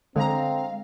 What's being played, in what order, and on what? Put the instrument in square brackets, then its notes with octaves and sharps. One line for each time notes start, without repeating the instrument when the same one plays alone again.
[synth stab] D3 A#5 [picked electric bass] G#3 [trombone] C4 [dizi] F5